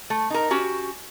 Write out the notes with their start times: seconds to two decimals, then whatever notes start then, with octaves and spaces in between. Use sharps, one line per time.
0.10 A3
0.30 D#4 A#4
0.51 C#4 F#4 G4